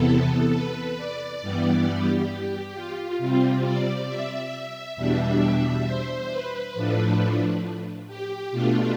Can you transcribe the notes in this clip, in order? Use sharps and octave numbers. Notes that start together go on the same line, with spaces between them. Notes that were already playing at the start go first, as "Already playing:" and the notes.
Already playing: E2 C3 E3 B3 A4
B4
D5
G2 E3 G3 B3
G4
F4
C3 G3 C4
D5
E5
E2 B2 G3 D4 E5
C5
B4
A2 F3 A3 D4
G4
B2 A3 D4 F4